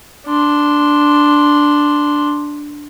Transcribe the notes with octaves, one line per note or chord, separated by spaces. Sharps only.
D4 C6